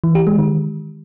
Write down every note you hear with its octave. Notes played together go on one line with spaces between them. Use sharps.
E3
G4
G#3
D#3